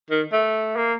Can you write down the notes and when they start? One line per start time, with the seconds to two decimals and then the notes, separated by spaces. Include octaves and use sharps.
0.10 D#3
0.32 A3
0.76 A#3